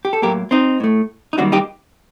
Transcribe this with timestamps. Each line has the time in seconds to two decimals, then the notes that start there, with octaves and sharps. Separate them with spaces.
0.05 G4
0.13 A4
0.22 A2 F#3 A#3 G4 A#4
0.51 C4 D#4
0.80 A2 A3
1.33 D#4
1.38 F#2 D#3 G3 A#3 D4 F#4
1.52 D#4 G4